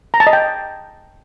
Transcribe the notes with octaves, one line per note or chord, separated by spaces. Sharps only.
A#5
A5
D#5
G5